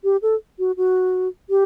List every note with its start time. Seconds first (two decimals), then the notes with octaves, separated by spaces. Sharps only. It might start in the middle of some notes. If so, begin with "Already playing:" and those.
0.04 G4
0.22 A4
0.59 F#4
0.77 F#4
1.50 G4